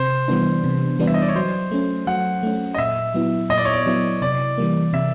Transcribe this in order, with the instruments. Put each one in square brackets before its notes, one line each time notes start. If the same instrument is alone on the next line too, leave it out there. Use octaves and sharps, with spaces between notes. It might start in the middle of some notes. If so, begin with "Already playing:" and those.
Already playing: [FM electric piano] C3 [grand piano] C5
[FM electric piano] E3 G3 B3 D4
C3
E3 G3 B3 D4
[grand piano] E5
D#5
D5
C#5
[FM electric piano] F#3 [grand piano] C5
[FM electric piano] A3 C#4
[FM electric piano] F#3 [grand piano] F#5
[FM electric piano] A3 C#4
[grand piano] D#5
[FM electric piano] A#2 [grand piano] E5
[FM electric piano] F#3 B3 E4
[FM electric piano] A#2 [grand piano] D#5
[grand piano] D5
C#5
D5
[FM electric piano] F#3 B3 E4
[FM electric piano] C3 [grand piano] D5
[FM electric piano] E3 G3 A#3
[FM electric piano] C3 [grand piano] E5